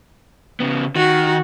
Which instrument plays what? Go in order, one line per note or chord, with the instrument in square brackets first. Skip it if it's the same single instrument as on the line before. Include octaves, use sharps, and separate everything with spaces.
[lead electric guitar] C#3 B3
[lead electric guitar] D#3 [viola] F#4